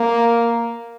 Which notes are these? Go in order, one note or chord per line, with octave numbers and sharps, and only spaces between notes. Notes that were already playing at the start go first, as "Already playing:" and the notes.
Already playing: A#3